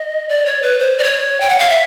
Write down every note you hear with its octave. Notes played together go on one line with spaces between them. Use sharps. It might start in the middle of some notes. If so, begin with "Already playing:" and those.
Already playing: D#5
D5
C#5
B4
C5
D5
C#5
G5
F#5
F5
E5